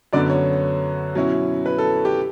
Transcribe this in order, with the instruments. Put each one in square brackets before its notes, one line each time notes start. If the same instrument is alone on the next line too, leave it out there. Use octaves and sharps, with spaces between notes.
[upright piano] F#2 D3 F#3 B3 D5
C#5
B2 F#3 C#4 E4
B4
A4
G4